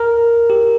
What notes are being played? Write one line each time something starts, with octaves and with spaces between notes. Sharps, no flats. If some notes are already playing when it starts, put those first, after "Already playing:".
Already playing: A#4
G4